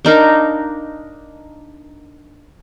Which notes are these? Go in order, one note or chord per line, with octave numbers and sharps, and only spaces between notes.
D4 D#4 A#4 F5